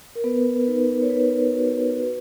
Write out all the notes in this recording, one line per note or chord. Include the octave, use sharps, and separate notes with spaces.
A#4
B3 B4
D#4 B4
C#5
D#4 B4
F#4
F#4